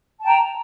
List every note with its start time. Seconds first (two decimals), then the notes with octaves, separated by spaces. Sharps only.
0.20 A5
0.23 G5
0.26 A#5